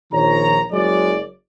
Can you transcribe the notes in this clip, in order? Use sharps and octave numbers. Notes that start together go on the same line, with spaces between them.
A#1 D#3 F3 C#5 A#5
F#1 F#3 G#3 C#5 D5